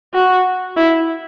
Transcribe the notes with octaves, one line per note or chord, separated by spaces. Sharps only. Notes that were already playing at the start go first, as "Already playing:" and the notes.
F#4
E4